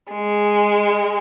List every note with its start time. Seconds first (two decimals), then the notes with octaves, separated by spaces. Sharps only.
0.12 G#3